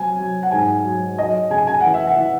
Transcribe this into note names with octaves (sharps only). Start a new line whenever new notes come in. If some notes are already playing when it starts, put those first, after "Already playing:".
Already playing: F#3 C4 G#5
F#3
F#5
G#2 G#5
F#3
F#3 D#5
C#3 G#5
G#5
E3 F#5
E5
F#5
E3